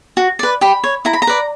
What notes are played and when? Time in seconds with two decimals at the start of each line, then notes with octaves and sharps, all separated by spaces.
0.17 F#4
0.39 B4 D5
0.61 G4 B5
0.84 C#5
1.05 E4 A#5
1.13 B5
1.22 A#5
1.27 B4 D5